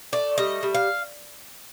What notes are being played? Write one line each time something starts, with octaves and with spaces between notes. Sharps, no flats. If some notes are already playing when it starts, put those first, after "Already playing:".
A3 D5
G3 D#5
G3
F5